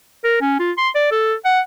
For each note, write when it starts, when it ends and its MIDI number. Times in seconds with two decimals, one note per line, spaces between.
0.24 0.37 70
0.41 0.59 61
0.59 0.72 65
0.78 0.89 84
0.95 1.09 74
1.11 1.34 69
1.45 1.60 78